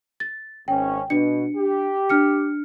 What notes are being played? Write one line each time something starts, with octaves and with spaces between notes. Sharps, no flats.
A6
G#1 C#4 G5
B2 D4 C#7
G4
D4 F6 C#7